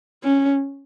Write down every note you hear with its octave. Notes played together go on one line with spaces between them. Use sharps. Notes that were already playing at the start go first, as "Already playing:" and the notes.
C#4